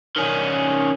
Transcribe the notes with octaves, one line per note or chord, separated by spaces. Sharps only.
D#3 C#4